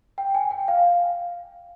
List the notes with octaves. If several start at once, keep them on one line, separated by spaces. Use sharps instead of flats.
G5
G#5
G5
F5